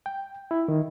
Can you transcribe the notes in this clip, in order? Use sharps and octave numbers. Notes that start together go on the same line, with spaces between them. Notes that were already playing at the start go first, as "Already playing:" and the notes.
G5
E4
D#3